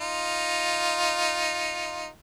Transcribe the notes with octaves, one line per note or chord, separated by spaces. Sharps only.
D#4 F4